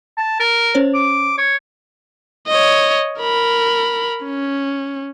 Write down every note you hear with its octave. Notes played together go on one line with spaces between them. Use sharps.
A5
A#4
C#4 C5 C#5
D6
C#5
C#5 D#5
A#4 B5
C#4